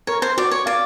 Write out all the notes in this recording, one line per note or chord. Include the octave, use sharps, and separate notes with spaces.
A#4 C#5
C5
F#4 D5
C#5
D5 F5